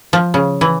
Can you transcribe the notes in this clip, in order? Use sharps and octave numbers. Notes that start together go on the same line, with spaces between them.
F3
C#3
E3